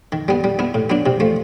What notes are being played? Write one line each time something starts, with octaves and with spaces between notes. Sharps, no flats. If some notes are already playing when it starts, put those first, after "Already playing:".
D#3
G3 B3
G3
B3 E4
A2
F#3 B3 D4
C3
F3 A3